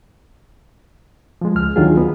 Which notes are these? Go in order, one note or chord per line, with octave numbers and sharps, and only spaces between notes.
F3 G#3
C#2 F6
D2 D#3 F#3 D4 F4 G#4
B3